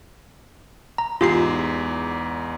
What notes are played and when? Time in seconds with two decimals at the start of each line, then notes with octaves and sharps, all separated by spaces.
0.98 A#5
1.21 E2 G#2 F4 G4 C7